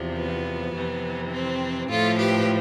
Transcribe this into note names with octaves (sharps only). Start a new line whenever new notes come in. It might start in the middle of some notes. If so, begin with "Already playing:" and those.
Already playing: E2 C3 F3
B3
F2 C3 E3
C4
A2 F3 F4 A4
G4 B4